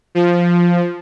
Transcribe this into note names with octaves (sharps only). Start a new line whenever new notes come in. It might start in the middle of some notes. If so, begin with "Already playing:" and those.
F3